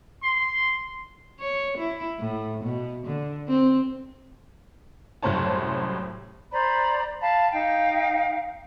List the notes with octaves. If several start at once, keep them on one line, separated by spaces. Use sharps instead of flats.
C6
C#5
E4
A2
B2
D3
C4
C2 F#2 A2 C5 C#5 A5
C5 D5 A#5 B5
F5 A5 B5
D#4 F5 G5